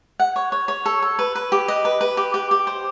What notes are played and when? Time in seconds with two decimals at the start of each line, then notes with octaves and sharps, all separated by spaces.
0.20 F#5
0.36 C#5
0.52 C#5
0.68 C#5
0.86 A4
1.02 A4
1.19 B4
1.35 B4
1.52 G4
1.68 D#5
1.85 B4
2.01 B4
2.17 G4
2.34 G4
2.51 G4
2.67 C5